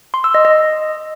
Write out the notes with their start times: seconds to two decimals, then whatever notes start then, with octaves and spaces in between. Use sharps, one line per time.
0.14 C6
0.24 E6
0.34 D#5
0.45 D#5